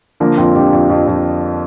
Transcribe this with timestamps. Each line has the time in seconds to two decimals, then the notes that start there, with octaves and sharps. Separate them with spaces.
0.20 D3 F3 A#3
0.37 F2 C4 F4
0.55 F2 D4 G4
0.73 F2
0.90 F2
1.07 F2